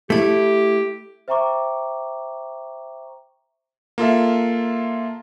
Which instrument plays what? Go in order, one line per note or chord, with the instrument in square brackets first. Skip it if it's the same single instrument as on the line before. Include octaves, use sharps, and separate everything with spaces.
[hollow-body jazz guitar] A3 E4 [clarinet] G4
[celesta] C5 E5 G5 A#5 C#6 D6
[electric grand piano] A#3 F4 A4 E5